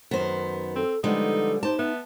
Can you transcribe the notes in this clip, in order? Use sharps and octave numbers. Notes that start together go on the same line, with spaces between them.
F#2 D#3 B3 C5
C4 A4
D3 F3 G3 G#3 B3 D#4 A4
D#4 G4 C5 A5
B3 E5